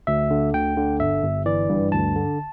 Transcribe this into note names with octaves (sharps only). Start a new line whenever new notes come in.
D2 E5
D3
D2 G5
D3
G1 E5
G1
E3 D5
G2
D2 A5
D3